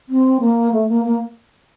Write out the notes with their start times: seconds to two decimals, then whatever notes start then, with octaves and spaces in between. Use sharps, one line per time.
0.09 C4
0.40 A#3
0.73 A3
0.89 A#3
1.05 A#3